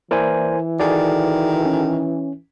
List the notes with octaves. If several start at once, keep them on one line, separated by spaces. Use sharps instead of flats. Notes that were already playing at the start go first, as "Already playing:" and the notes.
E3 A#3 E4 A#4 C5 D5 G#5
D#3 F#4 G#4 A4 D5
C#4